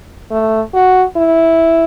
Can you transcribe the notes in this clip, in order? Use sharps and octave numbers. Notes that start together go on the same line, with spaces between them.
A3
F#4
E4